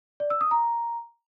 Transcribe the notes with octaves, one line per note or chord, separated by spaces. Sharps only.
D5
E6
D#6
A#5